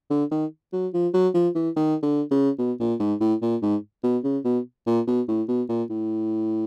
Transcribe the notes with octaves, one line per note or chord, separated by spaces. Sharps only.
D3
D#3
F#3
F3
F#3
F3
E3
D#3
D3
C#3
B2
A#2
G#2
A2
A#2
G#2
B2
C#3
B2
A#2
B2
A2
B2
A#2
A2